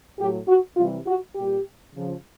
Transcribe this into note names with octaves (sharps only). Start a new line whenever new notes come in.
A2 F#3 G4
F#4
C3 E3 G3 F4
F#4
A#2 G3 G4
C#3 F3